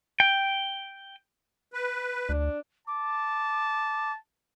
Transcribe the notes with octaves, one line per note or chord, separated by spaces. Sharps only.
G5
B4
D2 D4
A5 D6